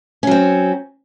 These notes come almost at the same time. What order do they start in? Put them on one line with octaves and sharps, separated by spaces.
C#4 F#3 C4